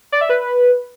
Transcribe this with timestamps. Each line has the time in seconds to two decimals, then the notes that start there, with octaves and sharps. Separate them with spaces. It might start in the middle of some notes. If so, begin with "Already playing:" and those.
0.12 D5
0.21 E5
0.29 B4